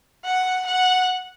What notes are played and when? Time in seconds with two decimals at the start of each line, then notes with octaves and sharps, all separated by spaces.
0.24 F#5
0.66 F#5